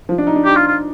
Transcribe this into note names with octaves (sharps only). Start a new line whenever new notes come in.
F3
D4
D#4
D4
D#4 G4
F4
F4